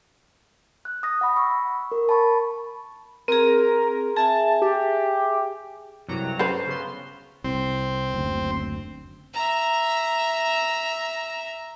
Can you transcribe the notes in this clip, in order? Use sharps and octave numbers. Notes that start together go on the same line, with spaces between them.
F#6
D#6 A#6
F#5 B5
B5 C#6 E6
A#4
A5 B5 C#6
C4 G#4 A#4
G#4 E5 G#5 A5
G4
C2 G2 F#3 A#5
C#4 A4 B4 C5
C#3 B3 C6
C2 C4
F#1 D2
E5 A#5